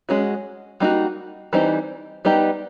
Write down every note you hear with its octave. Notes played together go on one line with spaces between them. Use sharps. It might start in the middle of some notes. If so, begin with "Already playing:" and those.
G#3 C#4 F#4
G3 A#3 D#4 F#4
E3 G3 C4 D#4
G3 B3 D#4 G4